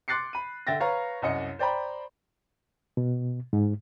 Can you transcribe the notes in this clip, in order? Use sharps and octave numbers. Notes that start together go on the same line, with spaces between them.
C6 D6 F#6 A6 C7 C#7
B5 D#7
D3 E5 G5 A6 A#6
B4 C#5 F5 A#5
C2 F#2 D#5 C#7
C5 D5 G5 A#5 B5
B2
G#2